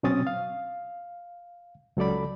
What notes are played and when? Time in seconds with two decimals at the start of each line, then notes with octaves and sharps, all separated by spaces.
0.03 B2 F#3 C4 C#4 D#6 A6
0.27 F5
1.97 C#2 F#3 A4 D5 B5